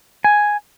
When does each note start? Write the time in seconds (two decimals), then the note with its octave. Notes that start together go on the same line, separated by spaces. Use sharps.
0.24 G#5